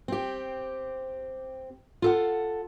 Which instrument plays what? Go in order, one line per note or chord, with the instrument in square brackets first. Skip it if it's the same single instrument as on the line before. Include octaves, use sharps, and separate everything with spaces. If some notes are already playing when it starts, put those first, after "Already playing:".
[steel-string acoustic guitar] C4 G4
F4 A4 F#5